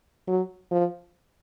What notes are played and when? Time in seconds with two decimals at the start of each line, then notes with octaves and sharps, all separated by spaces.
0.28 F#3
0.71 F3